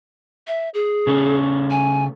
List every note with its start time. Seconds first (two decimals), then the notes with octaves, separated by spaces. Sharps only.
0.47 E5
0.74 G#4
1.07 C#3 A3 C#4
1.71 G#5